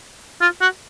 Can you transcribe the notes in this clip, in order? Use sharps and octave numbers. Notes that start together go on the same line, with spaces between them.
F4
F#4